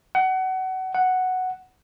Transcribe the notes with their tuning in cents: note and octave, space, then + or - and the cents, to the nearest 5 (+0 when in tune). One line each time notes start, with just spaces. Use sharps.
F#5 +25
F#5 +0